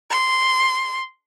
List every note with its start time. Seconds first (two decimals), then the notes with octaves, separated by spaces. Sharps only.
0.10 C6